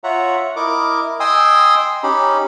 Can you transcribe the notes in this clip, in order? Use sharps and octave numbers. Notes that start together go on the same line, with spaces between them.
F4 C#5 E5 F#5 A#5
E4 A#4 D#5 D6
D#5 G5 G#5 C6 D#6 E6
C#4 D#4 G4 B5